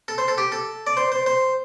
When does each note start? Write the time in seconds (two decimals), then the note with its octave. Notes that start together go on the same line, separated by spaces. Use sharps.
0.08 A4
0.18 C5
0.28 A4
0.38 G4
0.52 A4
0.87 D5
0.97 C5
1.12 C5
1.26 C5